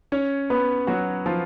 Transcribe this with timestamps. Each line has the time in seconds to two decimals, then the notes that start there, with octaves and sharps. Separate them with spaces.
0.12 C#4 C#5
0.50 B3 B4
0.87 F#3 F#4
1.26 F3 F4